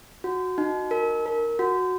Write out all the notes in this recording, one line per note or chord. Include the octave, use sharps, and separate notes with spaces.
F#4
D#4
A#4
A#4
F#4